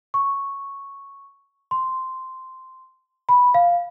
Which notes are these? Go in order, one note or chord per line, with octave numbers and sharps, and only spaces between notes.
C#6
C6
B5
F5